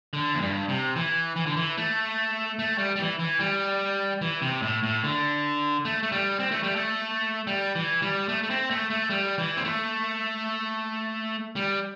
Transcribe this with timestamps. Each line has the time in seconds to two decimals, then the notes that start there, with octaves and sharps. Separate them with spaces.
0.13 D3
0.35 E2
0.41 G2
0.69 C3
0.96 E3
1.36 E3
1.46 D3
1.57 E3
1.77 A3
2.59 A3
2.78 G3
2.96 G3
2.99 E3
3.19 E3
3.39 G3
4.22 E3
4.42 C3
4.62 A2
4.83 A2
5.03 D3
5.85 A3
6.03 A3
6.12 G3
6.40 C4
6.51 A3
6.63 G3
6.76 A3
7.47 G3
7.75 E3
8.02 G3
8.29 A3
8.43 A3
8.50 C4
8.70 A3
8.90 A3
9.10 G3
9.38 E3
9.57 C4
9.64 A3
11.56 G3